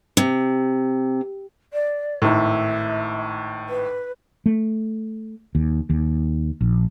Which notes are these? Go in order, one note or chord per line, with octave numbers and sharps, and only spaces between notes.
C3
D5
G#1 A2 E5
B4
A3
D#2
D#2
A#1